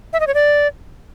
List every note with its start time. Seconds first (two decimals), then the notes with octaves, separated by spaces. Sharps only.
0.13 E5
0.20 D#5
0.27 C#5
0.34 D5